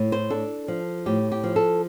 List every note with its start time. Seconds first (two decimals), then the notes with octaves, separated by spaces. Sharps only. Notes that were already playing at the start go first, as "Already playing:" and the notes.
Already playing: A2
0.12 C5
0.30 D4 A4
0.68 F3
1.06 A2 G4
1.32 G4
1.44 F3
1.56 A4